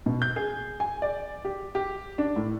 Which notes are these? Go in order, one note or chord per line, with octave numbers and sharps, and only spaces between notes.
B2
G6
G#4
G#5
D5
G4
G4
D4
A2